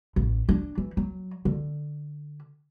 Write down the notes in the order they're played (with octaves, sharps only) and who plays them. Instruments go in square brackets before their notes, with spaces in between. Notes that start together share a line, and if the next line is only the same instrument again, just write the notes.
[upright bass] A1
D4
E3
F#3
D3